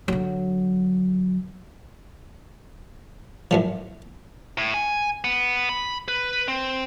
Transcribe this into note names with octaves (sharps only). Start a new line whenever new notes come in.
D3 F#3
F#2 A2 F3
A2
G#5
B3
B5
B4
C4